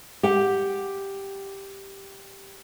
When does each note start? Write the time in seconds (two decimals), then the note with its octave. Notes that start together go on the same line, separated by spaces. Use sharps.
0.23 G4 F#5 G5